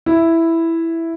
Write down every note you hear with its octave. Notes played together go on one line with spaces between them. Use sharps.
E4